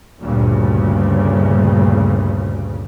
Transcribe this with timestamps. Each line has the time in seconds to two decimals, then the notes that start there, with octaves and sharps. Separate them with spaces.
0.21 D2 G2 A#2 C#3